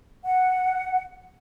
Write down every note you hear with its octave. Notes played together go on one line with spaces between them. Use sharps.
F#5